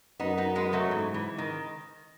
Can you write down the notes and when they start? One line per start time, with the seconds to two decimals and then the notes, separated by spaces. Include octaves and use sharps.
0.20 F#2 B3 D#4
0.38 B3 D#4
0.55 G#3 B3
0.73 F#3 A3
0.91 G#2 E3
1.14 E3
1.38 D#3